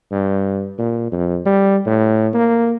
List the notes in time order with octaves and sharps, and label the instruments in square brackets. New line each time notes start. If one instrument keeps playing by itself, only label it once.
[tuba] G2
A#2
F2
G3
A2
A#3